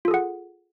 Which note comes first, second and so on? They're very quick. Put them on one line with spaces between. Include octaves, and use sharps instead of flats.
F4 A4 G#4 F#5